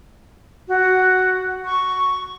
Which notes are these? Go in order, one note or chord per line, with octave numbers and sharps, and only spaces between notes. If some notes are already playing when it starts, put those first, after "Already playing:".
F#4
C#6